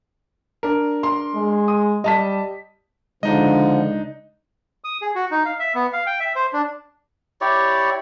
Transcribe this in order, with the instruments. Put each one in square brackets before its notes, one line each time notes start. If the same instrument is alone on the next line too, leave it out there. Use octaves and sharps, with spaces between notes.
[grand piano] D4 A#4
[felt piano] C6
[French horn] G#3
[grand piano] D#6
[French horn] G3 [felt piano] D#5 A5 B6
[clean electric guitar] C#2 G#3 [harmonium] D3 F3 [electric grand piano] D4 D#4 D#5
[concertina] D#6
G#4
F#4
D#4
F5
E5
B3
F5
G5
E5
C5
D4
[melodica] E4 G4 C#5 D5